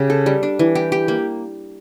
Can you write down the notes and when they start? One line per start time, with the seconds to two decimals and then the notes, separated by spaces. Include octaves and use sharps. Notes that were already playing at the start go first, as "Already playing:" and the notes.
Already playing: C#3 G4
0.10 A4
0.26 G3
0.43 D4
0.59 E3
0.75 G4
0.92 G4
1.08 A#3